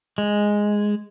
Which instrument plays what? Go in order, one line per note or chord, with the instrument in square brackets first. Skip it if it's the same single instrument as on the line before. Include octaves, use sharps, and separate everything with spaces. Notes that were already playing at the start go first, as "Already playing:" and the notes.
[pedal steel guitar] G#3